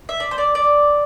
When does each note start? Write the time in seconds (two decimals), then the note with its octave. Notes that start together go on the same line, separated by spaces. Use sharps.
0.09 E5
0.20 D5
0.31 C5
0.38 D5
0.55 D5